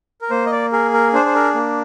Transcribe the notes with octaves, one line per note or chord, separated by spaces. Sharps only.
A#4
A#3 C5
D#5
D5
G#4 A#4
A#4
D4 C5
C5
A#4
A#3